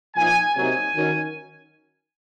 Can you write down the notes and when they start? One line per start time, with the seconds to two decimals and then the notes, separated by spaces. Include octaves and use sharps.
0.15 A#2 F3 A#3 D#4 G#5
0.55 C3 F#3 A#3 D#4 G#5
0.96 D#3 F#3 C#4